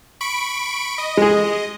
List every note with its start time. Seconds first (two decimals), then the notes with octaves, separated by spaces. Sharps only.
0.21 B5 C#6 D7
0.98 D#5
1.17 G#3 G#4